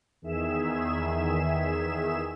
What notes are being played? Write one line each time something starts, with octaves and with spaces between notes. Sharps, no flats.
E2 D#3 G#4 E5 E7